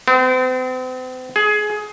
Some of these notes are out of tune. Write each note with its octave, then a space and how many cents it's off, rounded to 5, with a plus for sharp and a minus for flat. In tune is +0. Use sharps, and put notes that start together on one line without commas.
C4 -40
G#4 +20